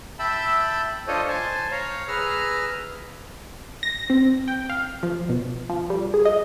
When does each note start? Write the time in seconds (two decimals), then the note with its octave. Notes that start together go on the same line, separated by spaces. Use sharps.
0.19 E5 G5 A5 B5 E6
1.08 D4 F4 A4 C5 C#5 D#5
1.28 C5 G#5 A5
1.71 C#5 F5 A#5
2.08 G#4 B4 A#5 E6 F6
3.83 A#6
4.10 C4
4.48 G5
4.70 F5
5.03 F3
5.29 B2
5.70 F3
5.90 G3
6.14 G#4
6.25 D#5